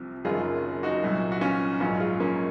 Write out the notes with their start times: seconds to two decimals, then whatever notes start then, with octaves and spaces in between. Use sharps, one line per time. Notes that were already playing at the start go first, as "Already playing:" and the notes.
Already playing: C2 C3 F3
0.25 F#1 F#2 D#3 F4 G#4
0.83 D#4 F#4
1.03 C2 A#2 F#3
1.32 F#4
1.41 C#4 F4
1.80 A#1 G#2 F#3 C#4 F4
2.00 F4 G#4
2.20 A#3 C#4